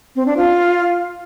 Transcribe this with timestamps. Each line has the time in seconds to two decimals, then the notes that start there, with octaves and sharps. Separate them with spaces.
0.16 C4
0.26 D4
0.37 F4